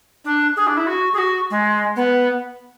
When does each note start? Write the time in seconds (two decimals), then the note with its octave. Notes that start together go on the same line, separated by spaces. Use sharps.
0.25 D4
0.56 G#4
0.67 D4
0.77 E4
0.87 F#4
1.13 G#4
1.18 F#4
1.50 G#3
1.96 B3